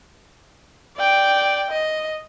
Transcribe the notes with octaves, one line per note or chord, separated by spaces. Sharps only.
D5 G5
D#5